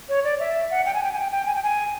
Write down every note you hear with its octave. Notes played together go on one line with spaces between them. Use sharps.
C#5
D5
E5
F#5
G5
G#5
G5
G#5
G5
G5
G#5
G5
G#5